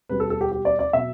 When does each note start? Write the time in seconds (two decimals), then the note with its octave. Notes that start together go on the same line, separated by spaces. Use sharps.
0.09 B2 G3 B4
0.20 A4
0.30 A4
0.41 G4
0.52 G4
0.65 D5
0.79 D5
0.93 B2 F#3 E5